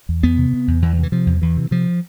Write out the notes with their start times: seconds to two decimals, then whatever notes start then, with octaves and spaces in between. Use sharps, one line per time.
0.09 E2
0.23 E2 B3
0.37 C3
0.53 C3
0.68 E2
0.82 E2 E3
0.98 C3
1.03 E3
1.12 C3 F3
1.26 E2
1.42 E2 E3
1.57 C3
1.71 C3 F3